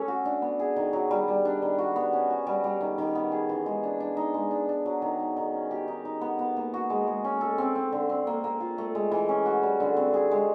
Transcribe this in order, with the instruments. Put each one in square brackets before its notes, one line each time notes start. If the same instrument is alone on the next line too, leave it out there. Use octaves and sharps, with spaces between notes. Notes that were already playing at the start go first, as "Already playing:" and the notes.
Already playing: [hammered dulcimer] A3 C#4 A4
F#4
D4
B3
G#4
D#3
F#3
G3
G3
D4
D#3
F#4
B3
C#4
F#4
G3
G3
D#3
D#3
B3
G#4
E3
G#3
D4
D4
D#4
G#3
D4
D4
F#3
D#3
D#4
D#3
C#4
G4
D#4
D#4
B3
B3
A#3
F#4
G#3
G#3
C#4
A4
C4
C4
D3
C4
A#3
A#3
F4
A3
G#3
E3
C#4
F#4
G3
D3
C4
G#4
G#3